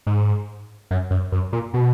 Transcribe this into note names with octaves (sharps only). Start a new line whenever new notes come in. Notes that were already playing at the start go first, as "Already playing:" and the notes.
G#2
F#2
F#2
F#2
A#2
B2